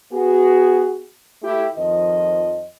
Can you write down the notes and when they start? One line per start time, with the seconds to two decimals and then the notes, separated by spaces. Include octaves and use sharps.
0.12 B3 F#4 G#4
1.42 A3 E4 G4
1.76 F2 D#3 F3 D#5